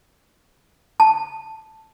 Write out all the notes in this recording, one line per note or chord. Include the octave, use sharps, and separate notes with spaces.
A5